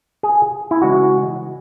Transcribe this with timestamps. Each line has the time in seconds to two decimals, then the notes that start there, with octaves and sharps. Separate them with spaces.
0.23 G#4
0.71 E4
0.82 C#3 E3 G#3 F#4